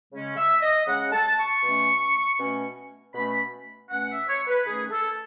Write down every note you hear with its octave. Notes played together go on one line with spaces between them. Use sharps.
C#3 G#3 C#4
E5
D#5
C#3 G#3 C#4 F#5
A5
C#6
B2 A3 C#4
B2 A3 C#4
B2 A3 C#4 B5
B2 A3 C#4 F#5
E5
C#5
B4
D#3 A3 C#4 G#4
A4